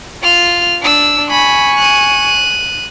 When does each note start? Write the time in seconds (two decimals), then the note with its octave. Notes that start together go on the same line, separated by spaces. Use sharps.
0.23 F4 F6
0.83 D4 E6
1.31 G#5 B5 C#6
1.77 F#6 D#7